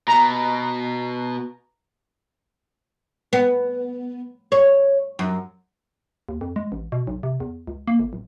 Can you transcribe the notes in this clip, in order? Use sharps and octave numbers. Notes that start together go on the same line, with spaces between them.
B2 A#5
B3
C#5
F#2
D#2
F2
G#3
A1
B2
B1
C3
E2
C#2
A#3
G1
D1